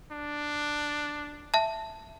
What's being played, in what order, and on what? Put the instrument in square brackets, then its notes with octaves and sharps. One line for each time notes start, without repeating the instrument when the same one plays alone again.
[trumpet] D4
[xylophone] E5 A5